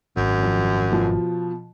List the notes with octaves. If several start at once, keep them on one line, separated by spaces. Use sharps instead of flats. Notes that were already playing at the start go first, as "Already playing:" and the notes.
G#1 F#2
F2
B2 F3